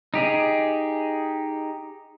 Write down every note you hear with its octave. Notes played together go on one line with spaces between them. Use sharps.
D#4 G4 G#4